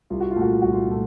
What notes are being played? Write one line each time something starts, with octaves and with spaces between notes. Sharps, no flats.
C2 F4
F#4
F4
A#2 A3 F#4
F4
C2 F#4
F4
A#2 A3